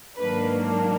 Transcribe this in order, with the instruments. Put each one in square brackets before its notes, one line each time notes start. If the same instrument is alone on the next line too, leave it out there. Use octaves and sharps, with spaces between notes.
[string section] G#2 D#3 F#3 A#3 D4 B4